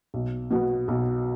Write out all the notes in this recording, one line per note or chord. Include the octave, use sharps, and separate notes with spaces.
B1
B2 F#3 B3
B1